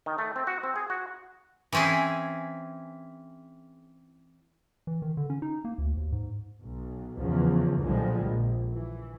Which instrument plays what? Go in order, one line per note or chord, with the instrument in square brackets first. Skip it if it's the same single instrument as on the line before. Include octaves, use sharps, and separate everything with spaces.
[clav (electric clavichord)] D#3
A3
C4
F#4
C4
G#4
F#4
[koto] E3 C4 C#4 E4 G#4
[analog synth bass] E3
D#3
D3
C#4
D#4
A#3
D2
D#2
G#2
[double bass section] B1
E2 C#3 F3
B1 A#2 D3 F3 G3 G#3
A#1
E3